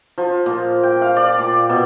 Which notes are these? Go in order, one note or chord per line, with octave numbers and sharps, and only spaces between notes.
F3
A#2
G5
F5
D5
A#2
B2